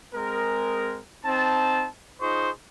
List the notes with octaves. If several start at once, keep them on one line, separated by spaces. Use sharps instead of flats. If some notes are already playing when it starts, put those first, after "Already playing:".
G#3 C4 G#4 A#4
C4 D#4 A5
D#4 F4 G#4 C5 C#6